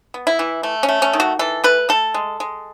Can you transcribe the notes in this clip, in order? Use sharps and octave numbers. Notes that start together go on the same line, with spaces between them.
B3
E4
E3
A3
C#4
A3
C#4
D#3
F#4
E3 A4
A3 B4
A3 A4
G#3
G#3